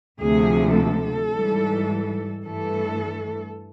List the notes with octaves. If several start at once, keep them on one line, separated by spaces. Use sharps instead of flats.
D2 C3 F3 A3 G#4
A4
G#2 E3 G3
G2 E3 A3 A4